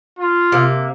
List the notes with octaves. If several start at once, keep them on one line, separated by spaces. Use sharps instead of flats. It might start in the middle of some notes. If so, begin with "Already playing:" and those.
F4
C3 A#3